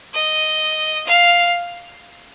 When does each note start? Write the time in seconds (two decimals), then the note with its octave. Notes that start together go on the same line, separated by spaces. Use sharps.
0.13 D#5
1.06 F5